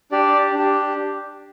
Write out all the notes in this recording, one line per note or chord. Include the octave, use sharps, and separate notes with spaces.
D4 G4 D5
D4 G4